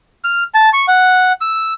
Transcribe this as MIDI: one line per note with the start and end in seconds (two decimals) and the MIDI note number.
0.24 0.43 89
0.54 0.69 81
0.73 0.86 85
0.88 1.32 78
1.41 1.73 88